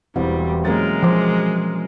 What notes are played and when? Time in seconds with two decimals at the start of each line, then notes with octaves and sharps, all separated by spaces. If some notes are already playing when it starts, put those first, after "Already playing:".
0.16 E1 B2 E3 G3 C4
0.65 F#3 G#3 A#3 C#4 A#4 A6
1.03 F3 C5 C6 D6